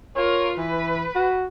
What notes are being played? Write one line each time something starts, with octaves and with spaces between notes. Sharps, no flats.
F4 A#4 C#5
E3 B4
F#4